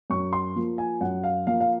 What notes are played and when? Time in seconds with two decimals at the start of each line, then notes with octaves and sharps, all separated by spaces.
0.10 F#2 C#6
0.33 C6
0.56 F3 A#3
0.78 G#5
1.01 F#2 F#5
1.24 F5
1.47 F3 A#3 F5
1.61 F5